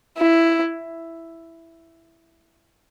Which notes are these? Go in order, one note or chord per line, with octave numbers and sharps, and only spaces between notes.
E4